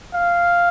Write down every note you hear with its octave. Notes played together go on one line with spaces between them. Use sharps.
F5